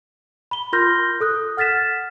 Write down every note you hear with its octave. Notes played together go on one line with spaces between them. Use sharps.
B5 G7
F4 A#4 C6 F6 G6 A#6
A4 D#6 F#6
F#5 F6 A6 B6 E7